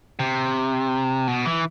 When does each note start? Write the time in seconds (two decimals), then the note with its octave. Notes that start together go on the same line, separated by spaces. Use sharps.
0.19 C3
1.27 B2
1.45 E3